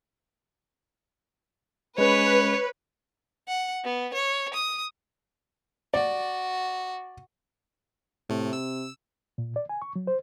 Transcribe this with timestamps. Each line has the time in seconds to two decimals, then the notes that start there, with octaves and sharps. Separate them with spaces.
1.98 G#3 C#4 B4 C#5
3.48 F#5
3.84 B3
4.14 C#5
4.54 D#6
5.94 F#4 D5
8.29 A2 C3 A3
8.53 E6
9.38 A#2
9.56 D5
9.69 G#5
9.82 C#6
9.96 F#3
10.07 C5